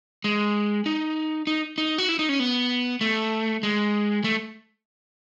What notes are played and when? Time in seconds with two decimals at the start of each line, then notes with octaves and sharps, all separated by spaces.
0.24 G#3
0.86 D#4
1.47 D#4
1.78 D#4
1.98 F#4
2.09 E4
2.19 D#4
2.29 C#4
2.40 B3
3.01 A3
3.63 G#3
4.24 A3